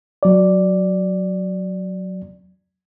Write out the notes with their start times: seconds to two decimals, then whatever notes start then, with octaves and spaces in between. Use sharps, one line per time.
0.23 F#3 D5